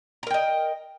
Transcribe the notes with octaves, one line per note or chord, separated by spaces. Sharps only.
A#4 D#5 G5 A#5